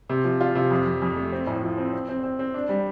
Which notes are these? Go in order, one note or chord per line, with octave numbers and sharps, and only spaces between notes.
C3
F3
F4
C3
F2
F2
F2
A3
C4
A2
F3
C4
C4
C4
C4
C4
D4
G3